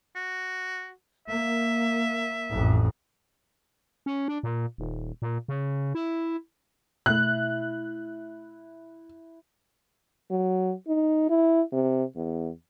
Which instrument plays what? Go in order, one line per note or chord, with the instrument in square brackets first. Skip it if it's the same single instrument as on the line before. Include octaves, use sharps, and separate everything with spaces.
[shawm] F#4
[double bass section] A#3 [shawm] E5
[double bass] A1 F2
[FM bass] C#4
D4
A#2
D#1
A#2
C#3
E4
[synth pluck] B2 A3 [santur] E4 [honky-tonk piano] F#6
[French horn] F#3
D#4
E4
C3
E2